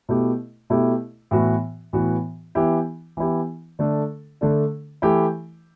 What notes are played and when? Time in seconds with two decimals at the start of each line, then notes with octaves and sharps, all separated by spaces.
0.09 B2 A3 E4 G4
0.70 B2 A3 E4 G4
1.31 A2 E3 B3 F#4
1.93 A2 E3 B3 F#4
2.55 E3 B3 E4 G4
3.17 E3 B3 E4 G4
3.79 D3 A3 D4 A4
4.41 D3 A3 D4 A4
5.02 E3 A3 E4 G4